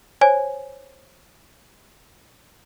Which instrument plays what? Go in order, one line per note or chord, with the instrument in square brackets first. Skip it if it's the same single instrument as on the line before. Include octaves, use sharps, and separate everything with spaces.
[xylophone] C5 C#5 G#5